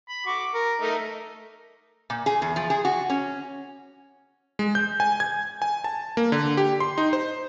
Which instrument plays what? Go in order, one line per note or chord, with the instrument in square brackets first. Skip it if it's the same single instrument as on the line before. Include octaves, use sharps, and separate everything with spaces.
[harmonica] B5
F#4 C#6 D6
A#4
A3 D#4 A#4
[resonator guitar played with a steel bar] A#2
G#4
E2
F3
G#4
F#4
C#4
[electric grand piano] G#3
G6
G#5
G#6
G#5
A5
A#3
D3
G4
C6
D#4
C5